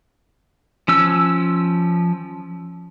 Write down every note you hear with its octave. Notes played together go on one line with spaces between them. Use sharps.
F3 C#4 E6